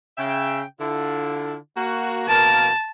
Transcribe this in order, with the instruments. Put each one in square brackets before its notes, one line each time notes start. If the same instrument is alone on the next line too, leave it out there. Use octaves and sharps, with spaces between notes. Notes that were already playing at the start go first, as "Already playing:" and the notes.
[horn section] C#3 E5 G5
D3 E4 F4
A#3 F#4
[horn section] B2 A#3 A#4 [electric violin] A5